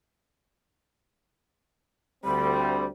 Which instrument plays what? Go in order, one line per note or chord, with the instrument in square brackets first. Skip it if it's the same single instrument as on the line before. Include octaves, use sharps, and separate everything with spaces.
[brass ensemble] D2 G3 C4 [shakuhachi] B5